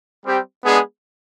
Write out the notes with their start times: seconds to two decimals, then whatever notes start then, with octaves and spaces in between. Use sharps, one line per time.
0.25 G3 C4 G4
0.65 G#3 B3 D4 G#4